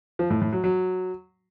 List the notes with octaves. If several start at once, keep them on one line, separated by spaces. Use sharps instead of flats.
F3
A2
A2
F#3
F#3